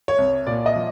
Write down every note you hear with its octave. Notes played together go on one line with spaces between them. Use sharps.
C#5
C2
A#2 D5
D#5
F3